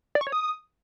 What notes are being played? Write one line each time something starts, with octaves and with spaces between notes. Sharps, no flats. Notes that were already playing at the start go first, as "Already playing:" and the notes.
D5
C#6
C#5
D#6